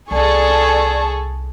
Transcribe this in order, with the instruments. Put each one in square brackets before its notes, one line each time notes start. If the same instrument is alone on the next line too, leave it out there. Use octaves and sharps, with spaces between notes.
[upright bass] C2 [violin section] G#4 A4 [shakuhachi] D5 [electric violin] A5 C#6